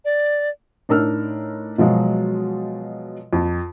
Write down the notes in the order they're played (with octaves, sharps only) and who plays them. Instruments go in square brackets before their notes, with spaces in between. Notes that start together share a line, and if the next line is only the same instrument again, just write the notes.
[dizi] D5
[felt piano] A2 D4 D#4 A#4 E6 F6
B2 F3 F#3 G#3
F2